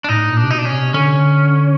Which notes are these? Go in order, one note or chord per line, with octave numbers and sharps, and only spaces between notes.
D4
A2 D#4
A#2
D4
C3
B2 D#4
D4
C#4
C3
D3 C#4